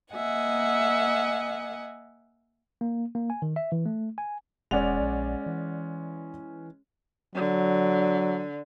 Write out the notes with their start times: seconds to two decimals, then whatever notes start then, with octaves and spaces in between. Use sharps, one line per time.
0.13 A#3 D#5 E5 F#5 G#5
2.81 A#3
3.15 A#3
3.30 G#5
3.42 D#3
3.56 E5
3.72 E3
3.86 A3
4.18 G#5
4.71 E1 G#3 C#4 D5 F#5 F7
5.01 A#1
5.46 E3
7.35 D3 F#3